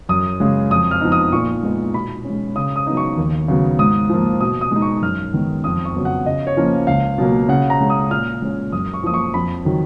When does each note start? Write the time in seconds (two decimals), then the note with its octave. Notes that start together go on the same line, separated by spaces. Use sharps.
0.09 F#2 D#6
0.40 C#3 G#3
0.70 F2 D#6
0.91 F6
1.01 F3 B3 D#4
1.12 D#6
1.32 A#2 C#6
1.63 G#3 B3 D#4
1.94 B2 B5
2.25 C#4
2.30 G#3
2.56 C#3 D#6
2.76 D#6
2.87 F#3 B3 D#4
2.97 C#6
3.17 D#2
3.48 C#3 F#3 B3
3.79 G#2 D#6
4.10 F3 A#3
4.41 B2 D#6
4.61 D#6
4.71 G#3 D#4
4.82 C#6
5.02 F#2 F6
5.34 D#3 G#3 B3
5.64 F2 D#6
5.85 C#6
5.95 C#3 F#3 B3
6.05 F#5
6.26 C#3 D#5
6.47 C#5
6.57 F3 A#3 C#4
6.87 C#2 F5
7.18 B2 F#3 A#3
7.49 C#3 F#5
7.70 A#5
7.81 G#3 C#4
7.90 D#6
8.10 A#2 F6
8.42 G#3 C#4
8.72 F#2 D#6
8.94 C#6
9.03 F3 A#3 D#6
9.14 C#6
9.34 F2 B5
9.65 D#3 F#3